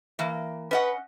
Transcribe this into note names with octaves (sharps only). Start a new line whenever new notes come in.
E3 A#3
C#4 B4 D#5 F#5